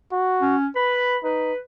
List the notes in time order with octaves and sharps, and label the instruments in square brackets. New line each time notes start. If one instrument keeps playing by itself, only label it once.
[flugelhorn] F#4
[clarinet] C#4
[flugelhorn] B4 [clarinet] B5
[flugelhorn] D#4 [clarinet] B4